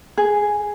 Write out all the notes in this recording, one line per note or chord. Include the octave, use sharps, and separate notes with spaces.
G#4